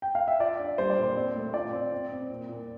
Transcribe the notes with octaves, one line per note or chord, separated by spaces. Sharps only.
G5
F5
E5
F4 D5
D4
G3 C5
D5
A#2
C5
C4
A3
F4 D5
C4
C4
C4
A#2
A#2